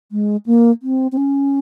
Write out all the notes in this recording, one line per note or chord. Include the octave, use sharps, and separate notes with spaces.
G#3
A#3
C4
C4
C#4